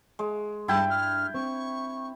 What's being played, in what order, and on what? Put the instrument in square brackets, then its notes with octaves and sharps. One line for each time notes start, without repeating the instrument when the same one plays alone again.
[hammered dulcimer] G#3
[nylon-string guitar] G2 [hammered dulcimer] E4 G5 [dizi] A5
[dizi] F6
[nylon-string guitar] C4 [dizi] C#6